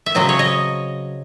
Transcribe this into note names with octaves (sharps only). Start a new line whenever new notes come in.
E5
C#3 F#3 C4 D#5
C#5
D#5